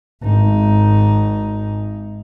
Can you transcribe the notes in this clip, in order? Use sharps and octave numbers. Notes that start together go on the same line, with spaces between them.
G#1 D#4